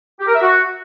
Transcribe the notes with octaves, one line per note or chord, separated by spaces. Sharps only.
G4
A#4
E5
F#4